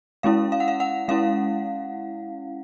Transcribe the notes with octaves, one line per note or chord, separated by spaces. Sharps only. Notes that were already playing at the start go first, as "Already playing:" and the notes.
G#3 C#4 E4 F5
F5
F#5
F5
F#5
G#3 C#4 E4 F5